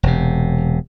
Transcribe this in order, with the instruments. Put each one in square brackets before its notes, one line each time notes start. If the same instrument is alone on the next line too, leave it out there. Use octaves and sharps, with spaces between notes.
[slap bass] E1 C3